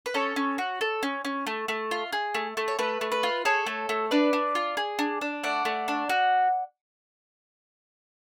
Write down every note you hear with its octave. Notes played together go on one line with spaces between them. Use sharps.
B4
C#4 A4 C#5
C#4
F#4
A4
C#4
C#4
A3
A3
F4
G#4
A3
A3
C#5
A3 B4
A3
B4
F4
G#4 A4 C#5
A3
A3
D4 B4 D5
D4
F4
G#4
D4
D4
A3 D5 F#5
A3
D4
F#4